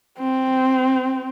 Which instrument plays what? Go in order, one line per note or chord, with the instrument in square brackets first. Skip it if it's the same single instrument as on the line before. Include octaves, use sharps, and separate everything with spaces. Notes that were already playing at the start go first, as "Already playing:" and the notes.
[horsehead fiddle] C4